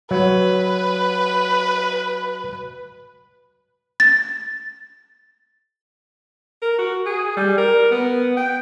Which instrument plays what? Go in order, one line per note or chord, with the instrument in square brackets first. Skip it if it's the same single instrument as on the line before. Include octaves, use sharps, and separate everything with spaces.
[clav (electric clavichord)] F#3 [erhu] B4
[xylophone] A6
[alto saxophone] A#4
F#4
G#4
G3
A#4
B3
G5